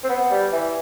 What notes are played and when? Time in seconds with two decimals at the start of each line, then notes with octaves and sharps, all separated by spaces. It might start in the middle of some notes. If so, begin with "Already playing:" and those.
0.04 C4
0.09 B3
0.31 G3
0.52 E3